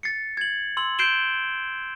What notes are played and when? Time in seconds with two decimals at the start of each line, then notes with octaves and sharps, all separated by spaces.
0.03 A6 C7 C#7
0.37 G#6 F#7
0.77 C6 E6 F#7
0.99 G6 C7 D7 E7 G7